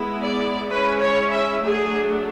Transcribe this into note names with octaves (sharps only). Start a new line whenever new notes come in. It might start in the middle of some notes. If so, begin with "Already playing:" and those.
Already playing: G#3 B3 E4
D5
G#3 C#4 E4 B4
C#5
E5
F#3 A3 D4 G#4